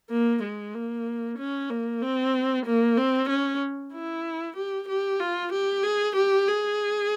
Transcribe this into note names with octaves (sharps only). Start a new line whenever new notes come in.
A#3
G#3
A#3
C#4
A#3
C4
A#3
C4
C#4
E4
G4
G4
F4
G4
G#4
G4
G#4